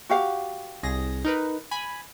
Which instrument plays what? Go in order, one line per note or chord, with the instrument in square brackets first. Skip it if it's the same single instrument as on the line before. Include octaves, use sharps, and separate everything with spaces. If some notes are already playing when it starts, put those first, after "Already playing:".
[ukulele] F#4 G4 F5
[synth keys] C2 G#4 A#6
D#4 A#4 B4
G#5 B5